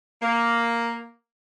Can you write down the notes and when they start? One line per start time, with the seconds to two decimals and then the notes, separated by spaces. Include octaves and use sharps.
0.22 A#3